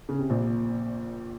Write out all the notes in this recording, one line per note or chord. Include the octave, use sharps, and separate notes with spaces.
C#3
C3
A#1 A#2